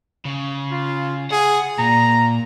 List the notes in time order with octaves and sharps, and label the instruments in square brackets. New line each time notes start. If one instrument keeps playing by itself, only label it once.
[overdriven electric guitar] C#3
[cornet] F4
[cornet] G#4 [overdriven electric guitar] F#5
[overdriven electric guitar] A#2 [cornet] A#5